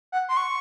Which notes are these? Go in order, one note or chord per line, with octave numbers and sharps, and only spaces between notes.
F#5
C6
C#6